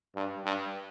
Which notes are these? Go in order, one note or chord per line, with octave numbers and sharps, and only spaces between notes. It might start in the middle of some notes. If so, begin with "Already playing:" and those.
G2
G2